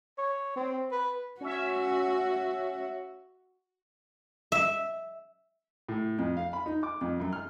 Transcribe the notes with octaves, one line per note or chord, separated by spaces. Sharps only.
C#5
C4
B4
C#4 F#4 E5
E5
A2
F2
F5
B5
D#4
D6
F2
F#2
F6